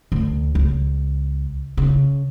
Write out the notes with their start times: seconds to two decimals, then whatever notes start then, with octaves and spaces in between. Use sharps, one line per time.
0.12 D2
0.55 C#2
1.77 C#3